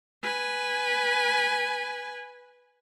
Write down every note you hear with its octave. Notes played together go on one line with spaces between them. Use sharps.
B4 G#5